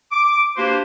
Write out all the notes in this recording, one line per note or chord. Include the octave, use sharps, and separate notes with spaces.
D6
A#3 D4 F#4 G4 B4 C5